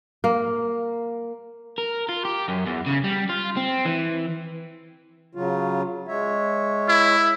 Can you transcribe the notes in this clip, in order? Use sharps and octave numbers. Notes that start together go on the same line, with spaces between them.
A#3
A#4
F4
G4
F#2
E2
C#3
G3
F4
C4
E3
C#3 F#3 F4
G#3 C#5 E5
E4